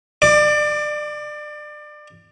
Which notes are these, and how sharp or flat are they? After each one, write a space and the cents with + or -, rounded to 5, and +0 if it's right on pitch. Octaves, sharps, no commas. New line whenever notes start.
D5 +30 D6 +0